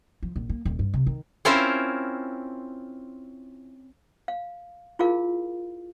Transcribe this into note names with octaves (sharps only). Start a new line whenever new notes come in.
F3
A#1
A#3
D#1
G2
C3
D#3
C4 C#4 E4 F4 A#4 C5
F5
E4 F4 G#4 A#4 F5